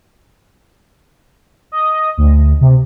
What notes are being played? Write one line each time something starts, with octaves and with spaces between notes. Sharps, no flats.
D#5
D2
C3